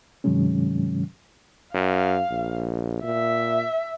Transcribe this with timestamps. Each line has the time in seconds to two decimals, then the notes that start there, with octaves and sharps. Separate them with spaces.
0.24 G2 C3 D#3 F#3 G#3 C#4
1.74 F#2 F5
2.30 A#1
3.03 A#2 E5